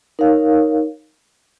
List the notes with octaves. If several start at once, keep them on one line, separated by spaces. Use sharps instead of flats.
D#4 A#4 C#5 F5